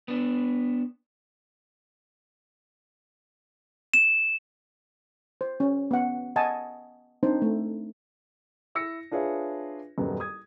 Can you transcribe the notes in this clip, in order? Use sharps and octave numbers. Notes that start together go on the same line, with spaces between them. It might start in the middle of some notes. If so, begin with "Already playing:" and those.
B3 D4
E7
C5
C#4
B3 F#5
D#5 F#5 G#5 A5
C4 D4 D#4 C5
A3
E4 E6 A#6 C#7
D4 F4 G#4 B4 C#5 E5
D#1 F#2 B3
D#6 G#6